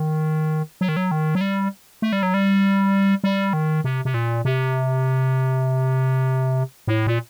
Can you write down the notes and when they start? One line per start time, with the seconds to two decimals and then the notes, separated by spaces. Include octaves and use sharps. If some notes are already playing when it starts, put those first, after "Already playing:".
Already playing: D#3
0.81 F#3
0.89 D#3
0.97 F#3
1.11 D#3
1.35 F#3
1.41 G3
2.02 A3
2.13 G3
2.23 F#3
2.34 G3
3.24 G3
3.53 D#3
3.84 C3
4.05 C3
4.14 A#2
4.45 C3
6.88 A2
7.07 A#2